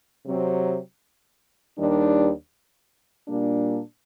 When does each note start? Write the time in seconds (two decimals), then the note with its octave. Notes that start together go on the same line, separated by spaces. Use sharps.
0.25 C3 F#3 C4
1.76 D#2 D#3 G3 D4
3.27 A#2 G3 A#3 D4